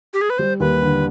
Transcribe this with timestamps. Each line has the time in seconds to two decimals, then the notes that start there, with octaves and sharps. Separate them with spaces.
0.14 G4
0.21 G#4
0.30 B4
0.38 G3 C5
0.60 D#2 B4
0.82 D3